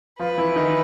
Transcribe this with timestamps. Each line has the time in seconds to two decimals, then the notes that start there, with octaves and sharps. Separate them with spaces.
0.19 F3 F4 B4
0.38 E3 E4
0.56 D#3 D#4